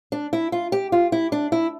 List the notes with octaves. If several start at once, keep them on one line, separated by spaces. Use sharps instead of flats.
D4
E4
F4
G4
F4
E4
D4
E4